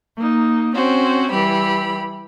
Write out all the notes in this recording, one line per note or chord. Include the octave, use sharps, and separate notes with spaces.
A#3 D#4
C4 C#4 F#4 C5
E3 G3 G4 B5